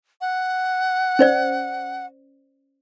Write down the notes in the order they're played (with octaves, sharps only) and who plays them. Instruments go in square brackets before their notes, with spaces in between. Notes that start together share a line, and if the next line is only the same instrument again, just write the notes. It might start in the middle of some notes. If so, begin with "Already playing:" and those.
[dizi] F#5
[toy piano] C#4 C5 D5